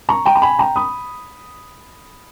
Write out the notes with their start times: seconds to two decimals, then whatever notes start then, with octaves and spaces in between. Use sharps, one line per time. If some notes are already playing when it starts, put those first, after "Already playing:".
0.09 A#5 C#6
0.26 G5 A#5
0.36 A#5
0.42 G#5 B5
0.58 G5 A#5
0.76 B5 D#6